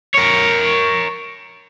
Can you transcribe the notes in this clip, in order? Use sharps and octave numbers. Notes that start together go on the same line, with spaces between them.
A#4 C#5